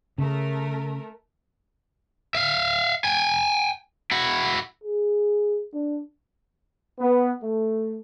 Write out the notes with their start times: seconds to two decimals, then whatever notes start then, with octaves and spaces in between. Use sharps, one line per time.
0.18 C#3 A3 A#4
2.35 E5 F5
3.05 G5 G#5
4.11 E4 F#4
4.84 G#4
5.73 D4
6.99 B3
7.42 A3